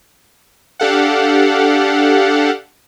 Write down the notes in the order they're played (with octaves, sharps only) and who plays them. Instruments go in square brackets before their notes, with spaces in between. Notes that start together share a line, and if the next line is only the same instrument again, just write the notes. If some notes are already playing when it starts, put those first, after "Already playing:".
[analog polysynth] D4 G4 A4 F5 F#5